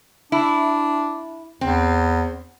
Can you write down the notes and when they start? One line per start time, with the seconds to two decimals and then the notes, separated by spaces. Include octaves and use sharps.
0.32 D4 E4
1.61 E2 C4